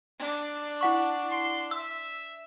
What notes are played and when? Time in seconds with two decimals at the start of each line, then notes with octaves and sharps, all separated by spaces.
0.19 D4
0.81 E4 F#5 C#6
1.32 C6
1.71 E5 E6